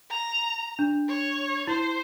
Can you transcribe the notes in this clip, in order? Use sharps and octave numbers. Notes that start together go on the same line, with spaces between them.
A#5
D4
C#5
E4 C5